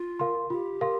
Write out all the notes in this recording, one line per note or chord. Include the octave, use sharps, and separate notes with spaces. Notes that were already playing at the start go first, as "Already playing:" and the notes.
Already playing: F4
A#4 F5 C6
F4 G4
A#4 F5 C6